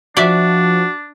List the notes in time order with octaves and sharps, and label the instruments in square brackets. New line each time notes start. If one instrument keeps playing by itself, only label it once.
[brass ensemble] F3 [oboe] D4 [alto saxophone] F#4 [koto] D5 E5